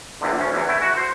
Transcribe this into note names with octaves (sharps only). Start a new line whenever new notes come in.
A#1 E2 D3
D2 C#4
E2 E3
A3 E4
F#4
C5